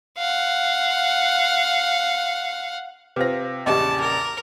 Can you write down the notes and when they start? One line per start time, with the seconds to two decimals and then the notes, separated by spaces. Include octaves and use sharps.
0.18 F5 F#5
3.16 C3 F4 B4 C5 A#6
3.66 A#1 E2 C#3 G4 D5 D#5 A5
4.00 A#4